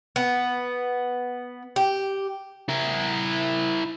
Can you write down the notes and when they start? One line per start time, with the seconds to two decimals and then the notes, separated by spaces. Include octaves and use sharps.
0.16 B3
1.76 G4
2.69 E4 A#4